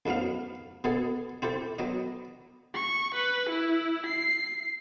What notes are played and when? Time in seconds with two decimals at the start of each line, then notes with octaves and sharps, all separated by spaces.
0.06 A1 G#2 F#3 B3 F5
0.84 B2 B3 G#4 A4
1.42 C4 E4 G4 A4
1.79 F#3 B3 D#5
2.74 C#6
3.15 B4
3.50 E4
4.07 C7